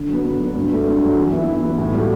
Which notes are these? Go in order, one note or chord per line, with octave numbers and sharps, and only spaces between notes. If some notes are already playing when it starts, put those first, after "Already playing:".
Already playing: D3
F#3 B3
D3
F#3 B3
G2
F#3 A3
G2
F#3 A3
E3
B3 E4
E3
B3 E4
A2
G3 B3 F#4 A4